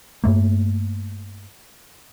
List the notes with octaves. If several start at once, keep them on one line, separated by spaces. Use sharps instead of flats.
G2 A3 A#3